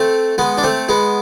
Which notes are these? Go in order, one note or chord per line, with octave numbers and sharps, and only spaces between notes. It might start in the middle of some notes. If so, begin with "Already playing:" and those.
Already playing: A3 C4
G#3 B3
D4
A3 C4
G#3 B3